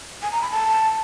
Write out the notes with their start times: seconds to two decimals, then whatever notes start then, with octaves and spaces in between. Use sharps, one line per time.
0.22 G#5
0.32 A#5
0.42 B5
0.51 A5